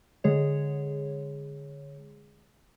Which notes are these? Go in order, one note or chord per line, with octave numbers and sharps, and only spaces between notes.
D3 G#3 G#4 C#5